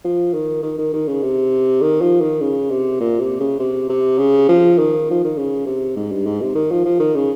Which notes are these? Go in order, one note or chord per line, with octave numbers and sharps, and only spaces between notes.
F3
D#3
D#3
D#3
D#3
C#3
C3
D#3
F3
D#3
C#3
C3
A#2
C3
C#3
C3
C3
C#3
F3
D#3
F3
D#3
C#3
C3
G#2
G2
G#2
C3
D#3
F3
F3
D#3
C#3